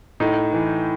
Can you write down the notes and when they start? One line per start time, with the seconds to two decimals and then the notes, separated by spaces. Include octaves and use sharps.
0.20 A2 D#4
0.53 E3